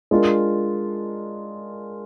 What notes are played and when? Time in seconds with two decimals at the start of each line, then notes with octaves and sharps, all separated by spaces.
0.11 G#3 D4 F4 A#4